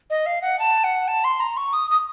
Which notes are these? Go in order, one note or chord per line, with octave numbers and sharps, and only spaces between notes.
D#5
F5
F#5
A5
F#5
A5
C6
A#5
C#6
D#6
D#6